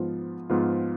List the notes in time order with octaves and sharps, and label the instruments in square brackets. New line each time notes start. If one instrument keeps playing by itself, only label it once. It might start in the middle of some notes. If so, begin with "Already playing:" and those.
Already playing: [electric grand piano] G#2 F3 B3 F4
G#2 F3 B3 F4